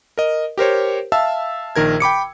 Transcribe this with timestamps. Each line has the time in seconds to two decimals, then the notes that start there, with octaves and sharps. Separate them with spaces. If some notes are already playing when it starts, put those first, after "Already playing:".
0.17 A#4 D#5
0.58 G4 A#4 C5 C#5
1.12 E5 F5 A5 E6
1.76 A#1 D#3 A#4 G#6
2.00 G5 B5 D6 C#7